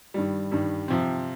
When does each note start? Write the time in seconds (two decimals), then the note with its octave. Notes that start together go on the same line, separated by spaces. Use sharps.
0.14 G2 D#3 G3
0.52 G2 D#3 G3
0.88 C3 F3 C4